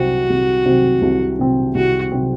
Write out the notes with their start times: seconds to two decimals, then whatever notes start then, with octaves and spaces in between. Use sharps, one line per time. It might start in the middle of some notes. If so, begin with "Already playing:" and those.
Already playing: C2 C3 F#3 C4 F#4
0.30 C2
0.66 C3 F#3 C4
1.02 C2
1.39 C3 F#3 C4
1.75 C2 F#4
2.12 C3 F#3 C4